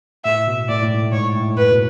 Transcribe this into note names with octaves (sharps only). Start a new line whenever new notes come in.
A2 E5
B2
A2 D5
A2
G#2
G#2 C#5
A2
F#2 B4
B2